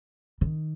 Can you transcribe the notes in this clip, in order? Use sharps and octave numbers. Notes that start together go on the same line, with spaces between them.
D#3